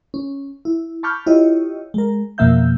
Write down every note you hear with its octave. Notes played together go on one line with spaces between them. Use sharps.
C#4
E4
A5 B5 C#6 D6 F6 G6
E4 F4 G4 C#5 D#5
G#3 A#4
F2 B2 A#3 E5 F5 G6